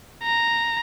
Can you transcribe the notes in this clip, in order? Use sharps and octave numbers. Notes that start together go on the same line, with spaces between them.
A#5